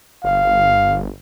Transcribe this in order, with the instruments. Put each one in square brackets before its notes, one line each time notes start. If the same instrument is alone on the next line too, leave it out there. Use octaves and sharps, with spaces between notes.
[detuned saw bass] G1 [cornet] F5